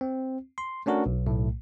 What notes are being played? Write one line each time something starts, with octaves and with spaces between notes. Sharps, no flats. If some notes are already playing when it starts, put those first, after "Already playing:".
C4
C6
A3 C#4 D4 F#4 A#4
B1
B1 A2 A3